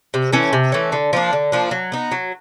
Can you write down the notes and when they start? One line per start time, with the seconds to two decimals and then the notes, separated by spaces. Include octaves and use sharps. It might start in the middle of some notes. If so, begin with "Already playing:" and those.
0.14 C3
0.33 E3 A3 C#4
0.53 C3
0.72 E3 A3 C#4
0.92 D3
1.13 F3 A#3 D4
1.33 D3
1.52 F3 A#3 D4
1.71 F#3
1.92 B3 D#4
2.12 F#3